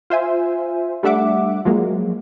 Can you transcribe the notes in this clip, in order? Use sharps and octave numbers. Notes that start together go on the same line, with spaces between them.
F4 C5 E5 G#5
G3 A3 D4 E5 F#5 D6
F3 F#3 G#3 A#3